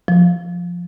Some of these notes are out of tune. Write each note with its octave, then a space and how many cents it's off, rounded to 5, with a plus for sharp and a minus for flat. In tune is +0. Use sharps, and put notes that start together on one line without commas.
F3 +5